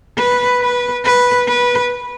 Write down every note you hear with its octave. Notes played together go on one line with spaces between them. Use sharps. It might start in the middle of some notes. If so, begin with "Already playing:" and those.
B4
B4
B4
B4